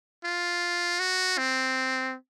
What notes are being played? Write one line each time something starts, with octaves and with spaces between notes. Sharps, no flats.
F4
F#4
C4